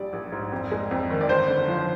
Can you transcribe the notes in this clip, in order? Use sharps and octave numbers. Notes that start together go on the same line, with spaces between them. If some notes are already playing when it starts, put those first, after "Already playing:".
Already playing: A#1 G3 D5
A#1
G#2
F2
G#3
F2
D#3
D5
G1 C5
D3
F3